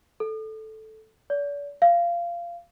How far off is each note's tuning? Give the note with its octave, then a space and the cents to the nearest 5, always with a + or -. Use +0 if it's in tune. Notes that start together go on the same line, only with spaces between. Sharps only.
A4 -5
D5 -40
F5 -20